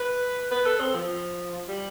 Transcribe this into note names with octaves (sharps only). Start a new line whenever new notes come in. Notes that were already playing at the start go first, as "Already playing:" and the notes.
Already playing: B4
B4
A4
C4
F3
G3